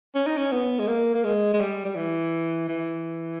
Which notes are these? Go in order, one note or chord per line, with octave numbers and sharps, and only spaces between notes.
C#4
D#4
C#4
B3
G#3
A#3
A#3
G#3
G#3
G3
G3
E3
E3